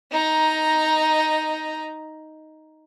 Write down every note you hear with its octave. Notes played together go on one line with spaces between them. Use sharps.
D#4 A#5